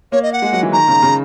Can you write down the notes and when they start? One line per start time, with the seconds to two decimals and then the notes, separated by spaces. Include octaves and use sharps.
0.12 A#3 C#5
0.22 D#5
0.32 F#5
0.42 G#3
0.53 F#3
0.63 E3
0.72 D#3 A#5
0.88 C#3
1.02 C#3